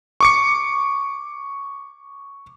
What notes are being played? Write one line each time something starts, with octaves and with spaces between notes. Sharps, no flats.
C#6 D6 C#7